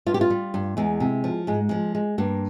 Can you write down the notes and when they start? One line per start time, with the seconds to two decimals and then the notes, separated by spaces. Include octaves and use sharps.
0.06 G2 F4
0.14 G4
0.21 F4
0.30 G3
0.54 G2
0.77 E2 G#3
1.00 C3
1.24 F3
1.47 G#2 G#3
1.69 F3 G#3
1.95 G#3
2.18 G2 A#3